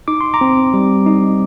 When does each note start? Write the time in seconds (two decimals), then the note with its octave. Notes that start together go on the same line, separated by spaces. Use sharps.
0.08 D#4 D6
0.21 C6
0.34 A#5 D6
0.41 C4
0.74 G3
1.06 D#4